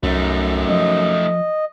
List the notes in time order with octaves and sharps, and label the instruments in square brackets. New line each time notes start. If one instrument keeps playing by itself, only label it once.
[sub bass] C2 [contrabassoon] F#2 [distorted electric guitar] A3 D#4
[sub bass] F3 [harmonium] D#5